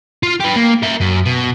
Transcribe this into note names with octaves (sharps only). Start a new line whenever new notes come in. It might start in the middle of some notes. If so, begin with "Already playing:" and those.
F4
G4 B4
A#3
A#4 E5
F#2
B2